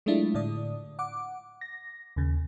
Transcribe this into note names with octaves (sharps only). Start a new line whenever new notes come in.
F#3 G#3 A3 D4 E4 F4
A2 D3 D5 D#6
F#5 D6
A#6
D#2 C#3